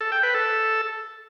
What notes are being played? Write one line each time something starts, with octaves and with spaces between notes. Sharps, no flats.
A4
G5
B4
A4